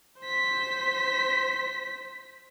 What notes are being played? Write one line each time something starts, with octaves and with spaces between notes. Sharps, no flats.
C5 B6